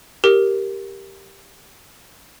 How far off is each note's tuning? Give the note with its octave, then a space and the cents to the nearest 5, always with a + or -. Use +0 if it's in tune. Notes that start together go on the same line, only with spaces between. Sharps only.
G4 +0 A#4 +0